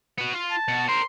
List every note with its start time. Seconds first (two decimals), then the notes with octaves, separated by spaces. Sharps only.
0.18 B3 F#4
0.34 F4
0.51 A5
0.68 B2 F#4
0.88 A#4 C5 C6